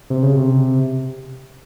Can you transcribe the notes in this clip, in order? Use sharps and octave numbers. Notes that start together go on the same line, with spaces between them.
C3
C#3
C3